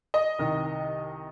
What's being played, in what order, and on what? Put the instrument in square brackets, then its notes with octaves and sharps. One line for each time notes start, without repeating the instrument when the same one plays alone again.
[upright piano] D#5
C2 C3 D#3